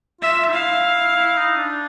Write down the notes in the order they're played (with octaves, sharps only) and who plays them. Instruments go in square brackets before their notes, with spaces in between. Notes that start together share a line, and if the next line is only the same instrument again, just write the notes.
[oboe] F4 [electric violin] E5
[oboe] D#4
[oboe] E4 [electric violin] F5
[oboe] E4
D#4
D4